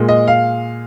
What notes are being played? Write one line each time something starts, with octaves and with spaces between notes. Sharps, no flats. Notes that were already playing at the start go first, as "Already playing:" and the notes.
Already playing: A#2 G#3
D#5
F5